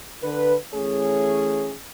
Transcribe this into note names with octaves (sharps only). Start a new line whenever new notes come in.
D3 B4
E3 A3 C#4 G#4 C#5